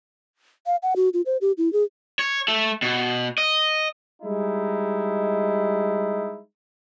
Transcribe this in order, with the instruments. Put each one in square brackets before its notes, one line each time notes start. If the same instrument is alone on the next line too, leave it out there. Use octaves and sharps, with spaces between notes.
[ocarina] F5
F#5
F#4
F4
C5
G4
E4
G#4
[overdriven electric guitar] C#5
A3
B2
D#5
[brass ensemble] G3 G#3 D#4 E4